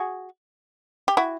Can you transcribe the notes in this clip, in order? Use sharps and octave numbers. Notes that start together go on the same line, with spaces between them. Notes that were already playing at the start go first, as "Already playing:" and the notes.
Already playing: F#4 G#4
G4
E4 F#4